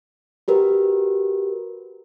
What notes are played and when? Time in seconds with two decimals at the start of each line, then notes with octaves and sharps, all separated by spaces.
0.48 F#4 G4 A#4 B4